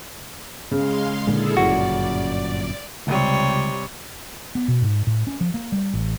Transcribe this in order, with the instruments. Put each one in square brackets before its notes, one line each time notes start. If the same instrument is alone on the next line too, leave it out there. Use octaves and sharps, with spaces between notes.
[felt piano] C#3 [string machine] G#3 F5 C6
[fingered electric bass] A#2 D3 G#3 [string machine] E4 G#4 A4
[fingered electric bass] G1 F#2 A#2 [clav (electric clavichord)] F#4 [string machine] D5
[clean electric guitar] C#2 [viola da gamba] C3 G3 C#5
[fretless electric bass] B3
B2
G#2
A2
C#4
F3
A#3
G3
A1